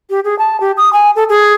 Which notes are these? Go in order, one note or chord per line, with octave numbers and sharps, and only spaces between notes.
G4
G#4
A5
G4
D#6
G#5
A4
G#4